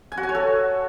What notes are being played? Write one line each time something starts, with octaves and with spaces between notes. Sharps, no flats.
G#5
F#4
G#5
C#5
A4